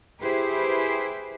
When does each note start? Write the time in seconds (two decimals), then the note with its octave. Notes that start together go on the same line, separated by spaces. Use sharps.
0.20 E4 G4 G#4 B4 C5